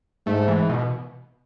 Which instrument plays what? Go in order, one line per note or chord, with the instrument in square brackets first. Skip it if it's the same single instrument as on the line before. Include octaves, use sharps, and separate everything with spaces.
[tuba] G#2 [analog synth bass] A3
[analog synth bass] E3
B2